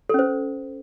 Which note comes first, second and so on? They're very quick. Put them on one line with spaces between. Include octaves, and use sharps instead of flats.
A4 C#4 C5